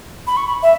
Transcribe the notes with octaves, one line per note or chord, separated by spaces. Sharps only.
B5
C#6
B5
E5